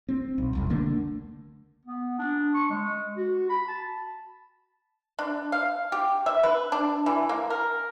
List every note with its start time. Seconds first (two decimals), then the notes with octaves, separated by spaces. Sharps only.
0.09 C4
0.38 B1
0.53 E1 C2 F2
0.70 D3 A3 A#3 D4
1.85 B3
2.19 D4
2.55 C#6
2.70 G#3
3.17 F#4
3.50 B5
3.68 A5
5.19 D4
5.52 F5
5.92 G4
6.26 E5
6.43 B4
6.72 D4
7.06 E3
7.29 A#3
7.50 A#4